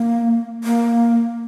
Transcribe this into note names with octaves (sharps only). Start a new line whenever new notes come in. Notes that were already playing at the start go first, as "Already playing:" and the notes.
Already playing: A#3
A#3